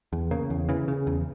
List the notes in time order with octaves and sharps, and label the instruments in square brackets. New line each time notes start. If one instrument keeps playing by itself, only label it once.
[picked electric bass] E2
C#3 A#3
E2
C#3 E3
C#3
E2